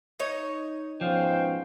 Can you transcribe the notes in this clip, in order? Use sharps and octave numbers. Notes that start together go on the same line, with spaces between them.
D#4 C#5
G#2 B2 F3 C#4 C5 F5 G5